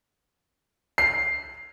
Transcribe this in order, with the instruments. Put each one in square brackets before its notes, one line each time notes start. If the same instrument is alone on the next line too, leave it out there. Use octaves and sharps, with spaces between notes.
[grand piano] C7